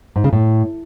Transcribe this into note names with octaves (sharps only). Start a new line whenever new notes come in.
G#2
C#3
A2